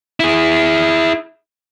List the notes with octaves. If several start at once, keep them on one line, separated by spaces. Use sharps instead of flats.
E4 G#4